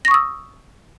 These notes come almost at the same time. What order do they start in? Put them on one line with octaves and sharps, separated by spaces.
A#6 C#6 D#6 E6